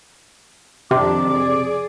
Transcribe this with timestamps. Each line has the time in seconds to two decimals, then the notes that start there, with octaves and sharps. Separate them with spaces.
0.91 F2 C3 D#3 D4 D6
1.31 G#4 D5